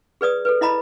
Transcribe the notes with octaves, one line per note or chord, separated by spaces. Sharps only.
G#4 B4 D5 D#6
A4 B4
E4 D#5 A#5 B5